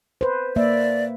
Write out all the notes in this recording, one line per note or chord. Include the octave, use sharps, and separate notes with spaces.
B4 C5
A#3 D5 E5